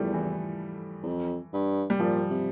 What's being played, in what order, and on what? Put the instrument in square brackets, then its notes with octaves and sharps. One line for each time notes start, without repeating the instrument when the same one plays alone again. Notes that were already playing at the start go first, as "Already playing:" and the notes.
Already playing: [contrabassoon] E2 [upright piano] F3 G3 A3
[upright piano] E3
[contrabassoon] E2
F2
G2
[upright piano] G3
[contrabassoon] A#2 [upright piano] F3
[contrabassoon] C3